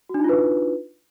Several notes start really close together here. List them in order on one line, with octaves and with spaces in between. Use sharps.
F#4 D4 D#4 F4 B4